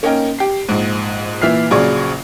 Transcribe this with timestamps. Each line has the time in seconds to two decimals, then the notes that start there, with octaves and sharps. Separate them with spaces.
0.03 A#3 C#4 D#4 A#4 G5
0.39 G4 C7
0.69 A#1 G#2
1.42 A#2 E3 E5 F6 C7
1.71 A#1 C#3 F#3 G#4 D5 C#6